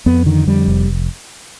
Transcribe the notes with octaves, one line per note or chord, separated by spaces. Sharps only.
F2 B3
D3 D#3
F2 G3
F1